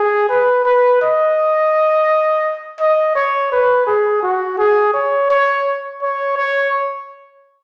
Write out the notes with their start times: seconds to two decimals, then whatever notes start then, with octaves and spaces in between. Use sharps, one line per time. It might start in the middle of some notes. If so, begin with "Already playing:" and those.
Already playing: G#4
0.29 B4
0.65 B4
1.02 D#5
2.80 D#5
3.15 C#5
3.52 B4
3.87 G#4
4.23 F#4
4.58 G#4
4.94 C#5
5.30 C#5
6.02 C#5
6.37 C#5